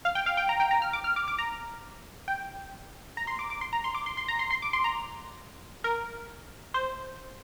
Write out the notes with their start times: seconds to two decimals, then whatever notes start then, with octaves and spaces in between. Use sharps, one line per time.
0.05 F5
0.15 G5
0.26 F5
0.37 G5
0.49 A#5
0.60 G5
0.71 A#5
0.82 F6
0.93 D6
1.04 F6
1.16 D6
1.28 D6
1.39 A#5
2.28 G5
3.17 A#5
3.27 C6
3.39 D6
3.50 D6
3.61 C6
3.73 A#5
3.84 C6
3.95 D6
4.06 C6
4.17 C6
4.28 A#5
4.39 C6
4.51 C6
4.62 D6
4.73 C6
4.84 A#5
5.84 A#4
6.74 C5